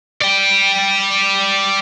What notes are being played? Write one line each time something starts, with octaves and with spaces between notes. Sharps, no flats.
D5 G5